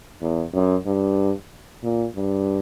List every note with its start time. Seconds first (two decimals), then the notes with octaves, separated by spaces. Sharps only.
0.21 E2
0.54 F#2
0.86 G2
1.83 A#2
2.16 G2